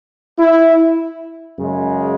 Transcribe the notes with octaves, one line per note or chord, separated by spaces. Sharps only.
E4
F#2 C#3 G#3